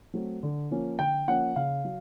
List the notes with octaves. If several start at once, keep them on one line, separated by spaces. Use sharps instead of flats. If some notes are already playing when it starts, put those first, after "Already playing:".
F#3 A3 C4
D3
F3 A#3 C#4
D3 G5
F3 A#3 C#4 F#5
C#3 F5
F#3